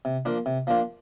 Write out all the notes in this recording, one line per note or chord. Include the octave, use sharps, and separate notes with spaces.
C3
F3 A#3 D4 F4
C3
F3 A#3 D4 F4